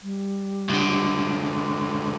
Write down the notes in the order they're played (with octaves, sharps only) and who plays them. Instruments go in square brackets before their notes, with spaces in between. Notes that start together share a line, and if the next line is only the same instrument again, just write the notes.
[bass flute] G3
[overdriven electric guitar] C#2 D3